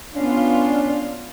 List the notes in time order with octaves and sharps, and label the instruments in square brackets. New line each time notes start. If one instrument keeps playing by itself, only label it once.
[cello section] B3 F4 F5 [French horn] C#4 [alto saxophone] D4